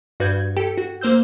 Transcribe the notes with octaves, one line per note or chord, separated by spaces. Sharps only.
G2 F#4 B4 G6 G#6
G4 A4 G5
F#4
A#3 C5 E6 G6